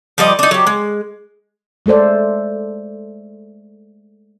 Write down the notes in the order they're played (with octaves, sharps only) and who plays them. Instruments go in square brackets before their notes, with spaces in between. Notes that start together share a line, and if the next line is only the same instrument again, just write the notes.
[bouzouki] F3 G3 D5 D#5
D4 D#4
F#3 G4
G#3
[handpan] G#3 A3 A4 C5 D5